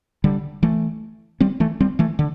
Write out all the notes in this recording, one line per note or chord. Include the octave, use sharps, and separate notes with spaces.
D3 G3
E3 A3
G3 C4
E3 A3
G3 C4
E3 A3
D3